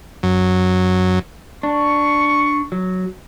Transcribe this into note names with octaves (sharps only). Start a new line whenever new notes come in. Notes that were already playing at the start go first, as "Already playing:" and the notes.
F#2
D4 C#6
F#3